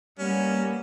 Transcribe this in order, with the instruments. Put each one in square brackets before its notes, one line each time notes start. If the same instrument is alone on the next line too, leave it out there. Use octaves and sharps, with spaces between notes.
[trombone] G3 [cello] A#3 B3 [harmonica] C#4